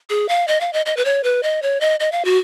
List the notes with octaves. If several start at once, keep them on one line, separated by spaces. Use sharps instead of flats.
G#4
F5
D#5
F5
D#5
D#5
B4
C#5
B4
D#5
C#5
D#5
D#5
F5
F#4